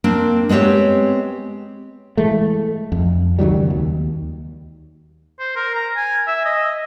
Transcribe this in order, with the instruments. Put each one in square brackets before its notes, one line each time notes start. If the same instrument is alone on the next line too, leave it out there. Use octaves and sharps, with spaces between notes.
[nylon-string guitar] A#3 C4 D4
G#3 B3 C4 G4 C#5
[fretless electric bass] E3 G#3 A3
F2
C#2 D#3 F#3 G3
D#2
[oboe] C5
A#4
A#5
G#5
E5
D#5